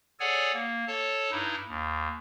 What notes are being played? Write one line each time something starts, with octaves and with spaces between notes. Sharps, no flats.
G#4 A4 C#5 D5 F#5 G#5
A#3
A4 C#5 A5
G2 D#4 E4
D#2